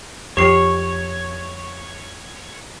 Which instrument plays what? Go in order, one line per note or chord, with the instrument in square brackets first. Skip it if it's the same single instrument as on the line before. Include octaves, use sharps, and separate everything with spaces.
[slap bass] F2 [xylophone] G4 C7 [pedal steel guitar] C#5